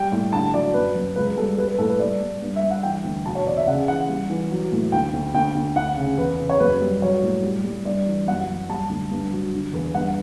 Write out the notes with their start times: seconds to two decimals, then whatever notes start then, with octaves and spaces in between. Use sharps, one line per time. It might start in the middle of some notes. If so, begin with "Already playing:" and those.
Already playing: G3 G5
0.12 A2
0.33 D3 A5
0.53 F#3 D5
0.74 F#2 B4
0.95 F#2
1.16 C#2 B4
1.37 G3 A4
1.58 G3 B4
1.68 B4
1.78 A2 A4
1.89 B4
2.00 G3 D5
2.21 G3
2.42 G2
2.56 E5
2.63 G2
2.71 F#5
2.83 E3 G5
3.04 D2
3.26 B2 A5
3.35 C#5
3.46 E2 D5
3.57 E5
3.67 C#3 F#5
3.88 E3 F#5
4.09 G3
4.29 E3
4.51 F#3
4.72 A2
4.92 D2 G5
5.13 D2
5.34 D2 G5
5.55 D2
5.76 D2 F#5
5.97 C#3
6.18 E2 B4
6.39 C#3
6.49 C#5
6.60 F#2 B4
6.81 G3
7.02 F#3 C#5
7.22 A2
7.43 G3
7.64 G3
7.85 G2 D5
8.06 E3
8.27 F#2 F#5
8.48 F#2
8.69 G3 A5
8.90 D2
9.11 G2
9.32 F#3
9.53 D3
9.73 E2
9.94 G2 F#5